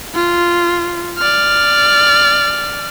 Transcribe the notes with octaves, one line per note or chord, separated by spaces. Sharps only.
F4
D5 F6